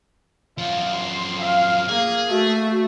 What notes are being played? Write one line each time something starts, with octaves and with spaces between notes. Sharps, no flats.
F#2 F3 F4
C6
F5
A#3 G#4
A3 F#4